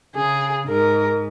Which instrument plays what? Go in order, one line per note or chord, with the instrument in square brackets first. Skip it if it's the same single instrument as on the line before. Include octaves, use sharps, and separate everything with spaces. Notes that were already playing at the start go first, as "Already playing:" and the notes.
[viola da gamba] C#3 [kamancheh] G#4
[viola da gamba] G#2 [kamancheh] A#4